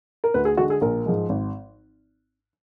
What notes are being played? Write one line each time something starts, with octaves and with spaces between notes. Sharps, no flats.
A#4
D2 B4
G#4
D3 G#3 F#4
G#4
A#1 A#4
G#2 F3 G#3
G#1